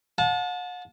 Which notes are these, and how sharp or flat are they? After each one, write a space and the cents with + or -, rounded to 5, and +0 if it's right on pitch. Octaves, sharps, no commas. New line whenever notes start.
F#5 -45 A5 -25